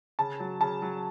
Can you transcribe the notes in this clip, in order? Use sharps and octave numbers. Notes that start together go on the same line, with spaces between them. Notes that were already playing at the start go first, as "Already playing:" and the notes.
C#3 A5
F#3
C#3 A5
F#3